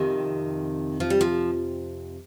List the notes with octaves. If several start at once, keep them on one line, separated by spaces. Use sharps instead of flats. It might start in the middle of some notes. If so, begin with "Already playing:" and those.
Already playing: F2 C3 D#3
F3
G3
F3